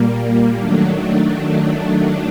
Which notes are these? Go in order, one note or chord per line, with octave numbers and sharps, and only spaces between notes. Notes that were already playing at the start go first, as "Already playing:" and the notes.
Already playing: A#2 G3 A#3
D#3 F#3 A3 D4